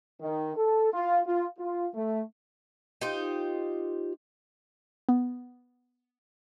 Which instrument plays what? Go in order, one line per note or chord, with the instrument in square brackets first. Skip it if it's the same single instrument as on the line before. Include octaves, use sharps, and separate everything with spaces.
[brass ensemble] D#3
A4
F4
F4
F4
A3
[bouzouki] D#4 F4 G4 C5
[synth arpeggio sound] B3